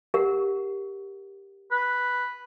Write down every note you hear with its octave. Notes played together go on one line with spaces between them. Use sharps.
G4 A#4 F#5
B4